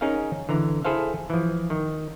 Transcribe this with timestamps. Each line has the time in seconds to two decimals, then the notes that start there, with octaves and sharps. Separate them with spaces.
0.01 C#4 D#4 G#4 A#4 F5
0.49 D3 E3 A#5
0.85 E4 G#4 A4 C5 F5
1.30 E3 F3
1.70 D#3